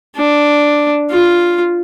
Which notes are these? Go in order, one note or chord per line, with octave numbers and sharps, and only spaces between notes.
D4
F4